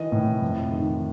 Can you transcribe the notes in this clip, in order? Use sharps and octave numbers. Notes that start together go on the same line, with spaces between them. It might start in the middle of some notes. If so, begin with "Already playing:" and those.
Already playing: D#3 E3 D#5
A2
F2
D#3